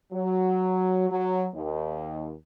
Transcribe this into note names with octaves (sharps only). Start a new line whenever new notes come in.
F#3
F#3
D#2